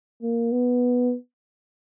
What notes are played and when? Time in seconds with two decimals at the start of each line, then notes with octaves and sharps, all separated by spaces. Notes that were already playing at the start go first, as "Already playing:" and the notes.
0.23 A#3
0.52 B3